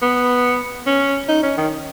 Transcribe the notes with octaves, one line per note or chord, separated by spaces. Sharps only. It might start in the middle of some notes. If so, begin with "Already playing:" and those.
B3
C#4
D#4
C#4
D#3